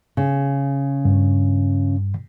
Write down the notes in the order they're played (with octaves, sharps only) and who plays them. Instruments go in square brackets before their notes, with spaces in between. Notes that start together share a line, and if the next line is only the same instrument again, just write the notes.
[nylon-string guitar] C#3
[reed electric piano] G2